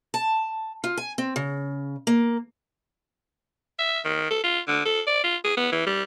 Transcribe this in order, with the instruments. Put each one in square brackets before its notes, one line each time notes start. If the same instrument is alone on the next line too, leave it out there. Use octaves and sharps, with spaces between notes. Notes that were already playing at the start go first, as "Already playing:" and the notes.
[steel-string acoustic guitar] A5
F4
G#5
C4
C#3
A#3
[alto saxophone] E5
D#3
A4
F4
D3
A4
D5
F4
G#4
B3
E3
G3